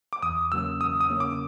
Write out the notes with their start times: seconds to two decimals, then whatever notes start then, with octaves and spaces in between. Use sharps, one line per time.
0.13 D6
0.22 E2 D#6
0.52 C#3 F#3 A#3 C#4 E6
0.81 E2 D#6
1.00 D#6
1.10 C#3 F#3 A#3 C#4
1.20 D6